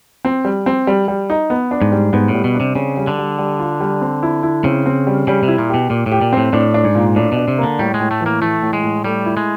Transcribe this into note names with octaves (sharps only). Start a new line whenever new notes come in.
C4
G3
C4
G3
G3
D#4
B3
D4
G#2
G3
G#2 B3
A2
G3
B2
D4
C3
C#3 C4
G3
D3
G3
G3
F4
G3
C4
E4
E4
C#3 C4
C4
G3
C#3 G3
C3
E4
A#2
B2 G4
A#2 G4
A2
G4
A#2
A2 C4
A2 D4
D4
G#2
A#2
A2 D4
B2 D4
C3
D3 A#3
A2 G3
G#3
A2
A3
E3
A#3
E3 A3
A2
G#3
A2
G3 A3
E4
G#3